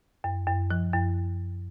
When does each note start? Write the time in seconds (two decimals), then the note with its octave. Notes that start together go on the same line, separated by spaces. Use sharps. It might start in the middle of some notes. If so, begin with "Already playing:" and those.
0.24 F#2
0.47 F#2
0.71 F3
0.93 F#2